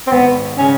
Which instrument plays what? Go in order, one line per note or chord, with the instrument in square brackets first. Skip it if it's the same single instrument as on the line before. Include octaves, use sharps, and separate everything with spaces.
[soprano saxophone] C4
[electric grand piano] G#1 [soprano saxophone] B3
[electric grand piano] C#3 [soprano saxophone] C#4